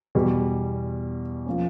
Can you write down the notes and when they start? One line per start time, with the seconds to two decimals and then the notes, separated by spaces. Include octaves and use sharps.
0.15 E2 B2 G3
1.46 F3 A#3 C#4